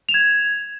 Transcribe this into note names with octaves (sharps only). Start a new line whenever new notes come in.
G#6 E7 F7